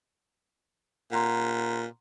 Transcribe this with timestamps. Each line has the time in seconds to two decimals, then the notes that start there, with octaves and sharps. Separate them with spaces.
1.11 A#2 F#5 A#5 C6